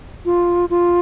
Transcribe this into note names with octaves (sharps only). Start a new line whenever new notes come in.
F4
F4